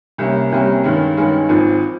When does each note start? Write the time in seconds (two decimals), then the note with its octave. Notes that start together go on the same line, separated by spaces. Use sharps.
0.18 C2 C3 G3 A#3 C#4
0.52 C2 C3 G3 A#3 C#4
0.84 G2 D#3 G#3 C#4
1.17 G2 D#3 G#3 C#4
1.49 G#1 G#2 F3